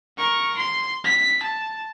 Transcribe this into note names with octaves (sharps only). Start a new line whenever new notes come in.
A#4 C#6
C6
B6
A5